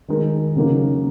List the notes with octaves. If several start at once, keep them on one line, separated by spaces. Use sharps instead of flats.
D#3 G#3 D#4 A#4
C#3 F#3 A#3 D#4